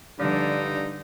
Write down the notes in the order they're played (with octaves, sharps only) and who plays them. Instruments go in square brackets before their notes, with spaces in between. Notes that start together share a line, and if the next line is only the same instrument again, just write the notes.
[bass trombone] G2 [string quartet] D3 [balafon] F3 G3 D5 [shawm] D#4